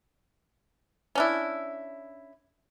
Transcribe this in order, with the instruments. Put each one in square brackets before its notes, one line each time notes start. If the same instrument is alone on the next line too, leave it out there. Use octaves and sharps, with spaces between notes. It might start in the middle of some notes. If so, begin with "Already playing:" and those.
[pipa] C#4 D4 E4